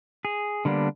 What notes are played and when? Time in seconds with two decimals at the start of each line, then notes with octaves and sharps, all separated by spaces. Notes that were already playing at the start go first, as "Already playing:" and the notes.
0.25 G#4
0.65 D3 G3 A#3 B3 D4